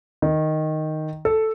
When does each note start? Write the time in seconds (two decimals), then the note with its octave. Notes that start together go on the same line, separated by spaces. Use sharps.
0.22 D#3
1.25 A4